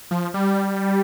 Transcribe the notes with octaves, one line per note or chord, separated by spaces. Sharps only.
F3
G3